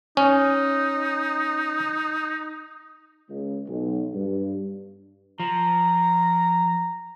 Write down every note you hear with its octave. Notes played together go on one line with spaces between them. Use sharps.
C#4 D#4
C#2
B1
G2
F3 A#5